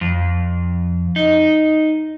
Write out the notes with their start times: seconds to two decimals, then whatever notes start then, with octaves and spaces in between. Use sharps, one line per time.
0.01 F2
1.16 D#4